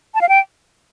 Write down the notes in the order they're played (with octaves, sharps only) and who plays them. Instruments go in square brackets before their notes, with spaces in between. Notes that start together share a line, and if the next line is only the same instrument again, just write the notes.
[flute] A5
F5
G5